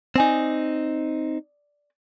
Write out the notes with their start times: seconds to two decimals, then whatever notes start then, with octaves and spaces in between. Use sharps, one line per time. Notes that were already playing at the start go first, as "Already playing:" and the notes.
0.16 C4 D#4 D5 G#5 D#6